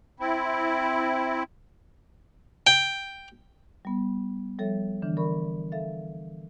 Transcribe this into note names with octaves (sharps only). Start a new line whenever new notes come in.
C4 E4
G5
G3 B3
F3 G3 A4 C#5 E5
D3 E3 D4
A#4 D5 B5 C#6
A4 E5 F5 A6